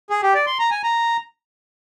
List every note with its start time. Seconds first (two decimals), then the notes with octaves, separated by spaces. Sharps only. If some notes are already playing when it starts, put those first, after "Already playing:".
0.10 G#4
0.23 G4
0.34 D5
0.47 C6
0.59 A#5
0.71 G#5
0.84 A#5